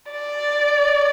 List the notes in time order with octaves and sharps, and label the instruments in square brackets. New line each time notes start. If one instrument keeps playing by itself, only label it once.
[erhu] D5